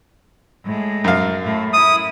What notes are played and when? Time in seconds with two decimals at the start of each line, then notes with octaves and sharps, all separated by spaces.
0.65 A2 G#3
1.04 F#2 F5
1.43 A2 A3
1.73 E4 D#6